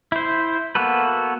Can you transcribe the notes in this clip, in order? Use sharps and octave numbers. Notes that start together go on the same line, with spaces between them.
E4 C5
A#3 B3 F#4 A4 B4